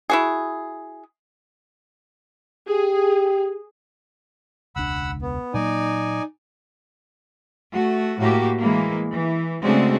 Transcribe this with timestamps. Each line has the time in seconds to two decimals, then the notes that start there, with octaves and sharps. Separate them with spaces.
0.10 E4 F#4 G#4
2.68 G4 G#4
4.76 E1 C#2 D4 F#5 B5 E6
5.22 B3
5.54 A#2 F#3 A#3 D#4 D5 G#5
7.71 A3 F#4
8.19 A2 A#3 F#4 G4
8.59 E3 G#3 A#3
9.13 E3
9.63 C#3 G#3 A3 C4 D4 F#4